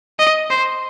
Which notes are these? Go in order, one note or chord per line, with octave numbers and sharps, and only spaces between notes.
D#5
C5